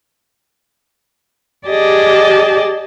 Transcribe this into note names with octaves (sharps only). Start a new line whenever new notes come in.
G4 G#4 D5 D#5 A5